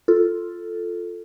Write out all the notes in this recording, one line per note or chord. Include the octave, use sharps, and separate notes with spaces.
F4 A4